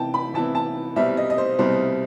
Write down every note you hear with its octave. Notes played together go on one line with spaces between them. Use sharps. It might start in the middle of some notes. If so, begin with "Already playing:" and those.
Already playing: C3 E3 B3 E4 G5 A5
B5
C3 E3 B3 E4 A5
A5
C2 B2 G3 C4 E5
D#5
D#5
C5
C2 B2 G3 C4 C5